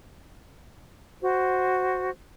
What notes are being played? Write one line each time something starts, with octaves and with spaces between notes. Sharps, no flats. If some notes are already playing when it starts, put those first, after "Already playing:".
F#4 C5